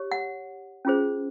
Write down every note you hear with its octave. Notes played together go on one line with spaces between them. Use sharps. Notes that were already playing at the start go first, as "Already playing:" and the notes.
Already playing: G4 C#5
F#5
C#4 F4 G#4 C5